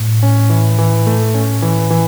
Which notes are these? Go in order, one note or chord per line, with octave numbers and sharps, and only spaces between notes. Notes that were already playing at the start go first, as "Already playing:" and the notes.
Already playing: A2
C#4
E3
E3
A3
C#4
E3
E3